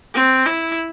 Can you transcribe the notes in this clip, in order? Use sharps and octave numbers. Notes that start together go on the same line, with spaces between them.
C4
E4